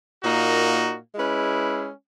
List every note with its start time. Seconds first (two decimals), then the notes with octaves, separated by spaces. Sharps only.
0.23 A#2 A#3 D#4 F#4
1.15 G#3 C#4 E4 B4